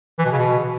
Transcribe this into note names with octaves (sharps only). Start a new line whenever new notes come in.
E3
B2
C#3
B2